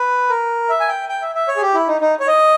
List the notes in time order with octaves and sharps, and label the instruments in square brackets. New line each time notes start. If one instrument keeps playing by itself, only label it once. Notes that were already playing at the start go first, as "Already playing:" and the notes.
Already playing: [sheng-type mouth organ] B4
A#4
E5
G#5
G5
G5
E5
E5
C#5
G#4
G4
E4
D#4
D#4
C#5
D#5